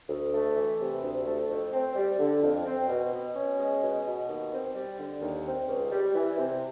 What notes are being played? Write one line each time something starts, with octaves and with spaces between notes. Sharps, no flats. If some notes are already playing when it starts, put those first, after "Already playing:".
D2
A3
E3
C3
D2
A3
F2
C4
G3
D3
F2
C4
B2
B2
C#4
G#3
B2
B2
D#2
C4
G3
D3
D#2
C4
C#2
G3
E3
C3